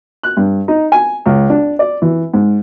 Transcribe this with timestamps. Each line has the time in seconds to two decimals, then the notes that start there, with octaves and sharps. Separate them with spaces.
0.23 F#6
0.37 G2
0.68 D#4
0.92 G#5
1.26 C#2
1.50 D4
1.79 D5
2.02 E3
2.33 G#2